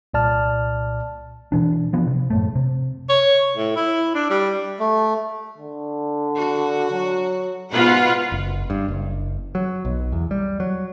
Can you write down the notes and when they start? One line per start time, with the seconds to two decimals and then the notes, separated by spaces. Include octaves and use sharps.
0.14 C2 A#2 D5 A5 F6
1.52 B2 E3 D4
1.93 E3 F3 B3
2.07 C3
2.30 F#2 A2 A3
2.55 C3
3.09 C#5
3.57 A2
3.76 E4
4.15 D4
4.30 G3
4.79 A3
5.58 D3
6.35 F#4
6.91 F#3
7.71 G#2 B2 F4 B4 F#5
8.32 F#1
8.70 G2
8.88 F#1
9.55 F#3
9.85 B1
10.12 E2
10.31 G3
10.60 F#3